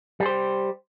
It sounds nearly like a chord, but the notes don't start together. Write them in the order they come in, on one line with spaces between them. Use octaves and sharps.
G3 G#4 C5 G4